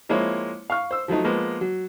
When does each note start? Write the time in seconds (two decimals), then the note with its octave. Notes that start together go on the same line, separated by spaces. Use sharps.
0.09 F3 G#3 A#3 C4 E4 C#5
0.70 F5 C#6 F6
0.91 C5 E6
1.08 F3 F#3 A3 D#4
1.24 F3 G#3 A#3 B3
1.61 F#3